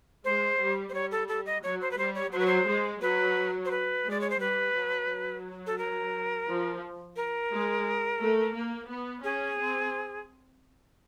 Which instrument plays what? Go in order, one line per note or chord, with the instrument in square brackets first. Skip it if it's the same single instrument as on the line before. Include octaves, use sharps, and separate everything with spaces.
[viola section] G#3 [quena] C5
[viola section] G3
[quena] C5
[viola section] G3 [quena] C#5
[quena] A4
A4
D#5
[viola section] F#3 [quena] C#5
[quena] C5
B4
[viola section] G3 [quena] C5
[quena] C#5
[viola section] F#3 [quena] C5
[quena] B4
C5
[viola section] G#3
[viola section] F#3 [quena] B4
[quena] C5
B4
[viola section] G#3
[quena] D5
C#5
C5
[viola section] G3 [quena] B4
[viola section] F#3
F#3
[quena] A4
A#4
[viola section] F3
[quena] A#4
[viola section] G#3
A3
A#3
B3
[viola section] C#4 [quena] G#4
[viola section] C4